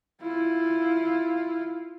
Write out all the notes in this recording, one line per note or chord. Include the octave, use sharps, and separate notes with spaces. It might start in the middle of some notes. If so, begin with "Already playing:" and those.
E4 F4